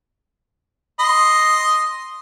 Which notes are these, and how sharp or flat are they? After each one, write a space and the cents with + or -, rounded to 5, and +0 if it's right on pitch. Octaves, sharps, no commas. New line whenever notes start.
D#5 +0 C6 +0